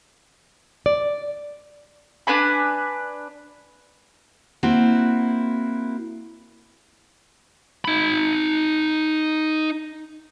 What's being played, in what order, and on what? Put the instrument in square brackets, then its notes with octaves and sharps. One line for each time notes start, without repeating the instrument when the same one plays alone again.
[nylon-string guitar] D5
[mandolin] D4 B4 G#5 B5
[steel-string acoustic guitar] A#3 C4 E4 F#4
[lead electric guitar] D#4 B5